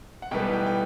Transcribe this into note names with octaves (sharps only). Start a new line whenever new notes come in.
F#5
B1 A2 E3 G3 B3 G5
G5
G5